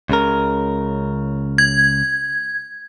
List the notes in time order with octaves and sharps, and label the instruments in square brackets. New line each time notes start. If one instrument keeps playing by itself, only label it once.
[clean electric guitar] C#2 C#3 A#4
[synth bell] G#6